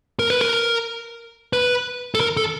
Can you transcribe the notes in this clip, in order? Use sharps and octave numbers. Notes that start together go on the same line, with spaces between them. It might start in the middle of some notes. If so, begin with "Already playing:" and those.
A#4
B4
A#4
B4
A4
A#4
A4